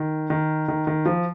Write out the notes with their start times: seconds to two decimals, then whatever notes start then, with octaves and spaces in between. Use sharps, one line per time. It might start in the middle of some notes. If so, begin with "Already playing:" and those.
Already playing: D#3
0.30 D#3
0.68 D#3
0.87 D#3
1.06 F3